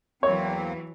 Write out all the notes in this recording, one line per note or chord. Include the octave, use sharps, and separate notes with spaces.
E2 E3 F#3 A#3 C4 C#5